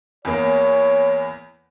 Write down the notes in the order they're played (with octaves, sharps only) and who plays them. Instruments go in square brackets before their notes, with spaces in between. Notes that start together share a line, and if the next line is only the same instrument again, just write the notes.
[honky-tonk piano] E2 A#3 [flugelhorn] C#5